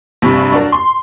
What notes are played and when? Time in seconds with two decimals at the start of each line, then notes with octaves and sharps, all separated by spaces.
0.22 A#1 G2 C3 B5 C#6
0.52 F#3 D4 F#4 A4 A#4
0.72 C6